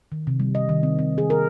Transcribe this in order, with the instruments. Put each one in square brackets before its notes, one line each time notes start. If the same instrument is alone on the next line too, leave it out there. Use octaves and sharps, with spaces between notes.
[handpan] D#3
C3
G3
D#5
D#3
C4
C4
G#4
A#4